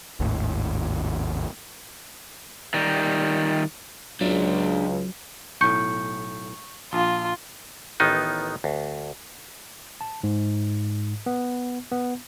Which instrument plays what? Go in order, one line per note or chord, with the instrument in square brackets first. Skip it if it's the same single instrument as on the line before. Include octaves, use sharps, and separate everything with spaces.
[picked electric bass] G#1 D#2 A2
[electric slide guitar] D#3 G3
[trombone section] C#2 [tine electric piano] F#3 [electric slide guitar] D4 F4
[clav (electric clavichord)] B1 A2 [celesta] C#6 G6 C#7
[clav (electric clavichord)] A#1 [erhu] F4
[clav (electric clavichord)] A1 D#3 B3 D#4
D2
[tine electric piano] A5
G#2
B3
B3